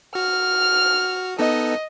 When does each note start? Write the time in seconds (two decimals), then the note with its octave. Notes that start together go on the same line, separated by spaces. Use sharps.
0.15 F#4 F6
1.39 B3 D#4 A4 D#5